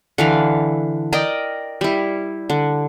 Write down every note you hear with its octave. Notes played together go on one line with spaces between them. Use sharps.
D3 E3 F5
A#4 D5 D#5 G5
G3 E4
D3